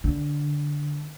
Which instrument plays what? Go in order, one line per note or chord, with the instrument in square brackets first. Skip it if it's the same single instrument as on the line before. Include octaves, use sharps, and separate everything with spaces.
[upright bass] D3